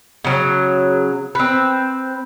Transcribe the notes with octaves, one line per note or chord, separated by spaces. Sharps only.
C#3 F#3
C4 B4